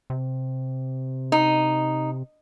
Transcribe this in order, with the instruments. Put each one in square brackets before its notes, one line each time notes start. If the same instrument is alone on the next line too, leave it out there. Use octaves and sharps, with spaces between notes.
[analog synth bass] C3
[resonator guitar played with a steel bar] D#4